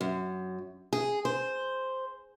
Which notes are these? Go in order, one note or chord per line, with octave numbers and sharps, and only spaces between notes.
F#2
G#4
C5